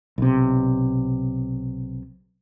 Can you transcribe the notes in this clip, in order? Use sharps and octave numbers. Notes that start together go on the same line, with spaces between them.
B1 C3